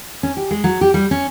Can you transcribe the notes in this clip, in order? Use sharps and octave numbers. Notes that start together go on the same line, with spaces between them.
C#4
G4
G#3
F#3
G4
G3
C#4